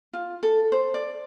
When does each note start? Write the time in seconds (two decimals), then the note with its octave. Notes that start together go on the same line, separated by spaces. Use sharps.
0.13 F4
0.43 A4
0.72 C5
0.94 D5